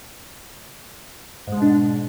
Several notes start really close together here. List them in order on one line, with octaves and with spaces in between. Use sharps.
G#2 G#3 B2 D4